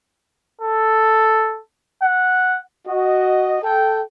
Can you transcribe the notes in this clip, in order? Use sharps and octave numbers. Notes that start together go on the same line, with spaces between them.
A4
F#5
F#4 D#5
A4 G5